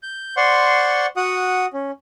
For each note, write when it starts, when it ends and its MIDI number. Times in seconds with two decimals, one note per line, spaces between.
0.03 0.35 91
0.37 1.06 72
0.37 1.06 74
0.37 1.06 78
0.37 1.06 84
0.37 1.06 85
1.17 1.66 66
1.17 1.66 78
1.17 1.66 87
1.73 1.91 61